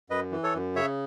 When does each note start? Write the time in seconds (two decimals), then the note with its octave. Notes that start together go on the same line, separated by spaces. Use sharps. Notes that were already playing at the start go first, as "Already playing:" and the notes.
0.10 F#2 B4 D#5
0.32 E3
0.43 A4 C#5
0.54 F#2
0.76 C#3 C#5 E5